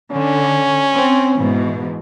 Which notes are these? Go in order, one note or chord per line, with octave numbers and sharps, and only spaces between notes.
D3 C#4
C4
G#2 B2 E3